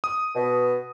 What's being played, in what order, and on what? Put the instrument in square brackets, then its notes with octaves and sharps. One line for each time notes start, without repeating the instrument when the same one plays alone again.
[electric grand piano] D#6
[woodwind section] B2